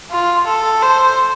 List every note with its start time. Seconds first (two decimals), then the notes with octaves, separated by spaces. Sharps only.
0.11 F4
0.46 A4
0.82 C5